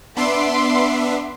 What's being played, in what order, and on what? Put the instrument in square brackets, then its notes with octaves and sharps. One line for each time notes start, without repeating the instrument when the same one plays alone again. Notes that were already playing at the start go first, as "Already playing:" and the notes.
[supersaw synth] B3 D4 E5 [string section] B5 C6 D6